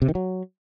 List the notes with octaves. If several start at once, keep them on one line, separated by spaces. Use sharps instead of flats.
C3
D#3
F#3